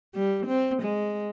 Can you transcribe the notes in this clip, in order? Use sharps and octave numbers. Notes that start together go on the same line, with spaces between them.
G3
C4
G#3